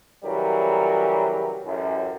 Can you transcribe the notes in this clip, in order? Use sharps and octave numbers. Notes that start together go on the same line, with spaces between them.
C#3 E3 F#3 G3 A#4
A1 F#2